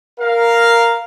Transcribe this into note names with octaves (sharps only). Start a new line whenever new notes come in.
A#4 F5